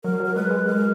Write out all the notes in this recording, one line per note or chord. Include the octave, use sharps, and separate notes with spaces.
F#3 A#4
F#3
A#4
G#3 B4
G#3
G#3 A#4